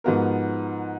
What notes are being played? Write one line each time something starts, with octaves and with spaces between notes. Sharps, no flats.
G#2 F3 B3 F#4 A#4